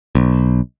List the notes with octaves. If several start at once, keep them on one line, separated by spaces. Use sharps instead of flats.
B1